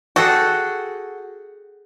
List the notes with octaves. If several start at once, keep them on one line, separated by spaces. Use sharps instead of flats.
F#4 G#4 A4 G5